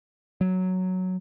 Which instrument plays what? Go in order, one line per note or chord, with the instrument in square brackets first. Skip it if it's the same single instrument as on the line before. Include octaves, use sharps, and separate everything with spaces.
[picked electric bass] F#3